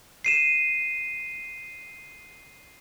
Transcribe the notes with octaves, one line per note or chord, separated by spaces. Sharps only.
C7 D#7 E7